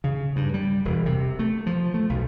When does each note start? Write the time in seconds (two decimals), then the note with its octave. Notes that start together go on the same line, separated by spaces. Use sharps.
0.04 C#3
0.36 G2
0.54 G3
0.85 E1
1.06 C3
1.39 A3
1.66 F3
1.94 A3
2.09 B1